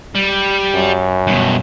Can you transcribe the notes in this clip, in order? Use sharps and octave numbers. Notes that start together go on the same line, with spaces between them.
G3
F#2
G2 B2